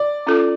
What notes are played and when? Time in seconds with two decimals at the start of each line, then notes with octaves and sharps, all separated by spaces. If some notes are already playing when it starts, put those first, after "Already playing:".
Already playing: D5
0.27 C#4 F4 A4